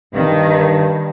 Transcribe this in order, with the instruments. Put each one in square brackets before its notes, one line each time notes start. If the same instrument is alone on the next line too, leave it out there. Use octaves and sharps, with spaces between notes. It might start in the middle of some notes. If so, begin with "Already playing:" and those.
[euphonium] G2 [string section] D#3